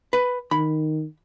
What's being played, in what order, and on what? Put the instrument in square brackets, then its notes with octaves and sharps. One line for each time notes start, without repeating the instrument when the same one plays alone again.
[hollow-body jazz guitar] B4
[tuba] D#3 [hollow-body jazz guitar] B5